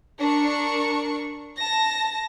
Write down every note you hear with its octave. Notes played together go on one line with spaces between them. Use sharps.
D4 A#4 C#6
A5 A#6